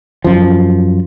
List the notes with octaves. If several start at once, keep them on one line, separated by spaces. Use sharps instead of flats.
F#2 F3